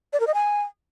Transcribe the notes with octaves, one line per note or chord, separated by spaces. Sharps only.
D5
A#4
D#5
G#5